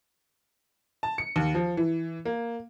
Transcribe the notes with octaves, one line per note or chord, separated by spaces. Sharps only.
A5
C#7
D#2
F3
E3
A#3